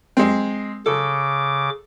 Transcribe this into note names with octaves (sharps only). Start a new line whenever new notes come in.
G#3 C4
C#3 A4 D6